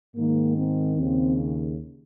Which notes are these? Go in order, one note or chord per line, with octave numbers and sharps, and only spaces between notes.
G#2 D#3 A#3
C4
D#2 C#3 C4